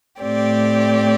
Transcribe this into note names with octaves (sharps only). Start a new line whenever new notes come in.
A2 A3 C4 G4 D5